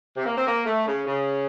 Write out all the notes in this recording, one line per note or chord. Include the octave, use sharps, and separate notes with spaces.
C3
A#3
C4
A#3
A3
C#3
C#3